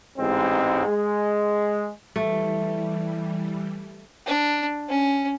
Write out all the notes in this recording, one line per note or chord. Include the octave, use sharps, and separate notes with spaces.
A1 G#2 G#3 C4
G#3
E3 G3 A3
D4
C#4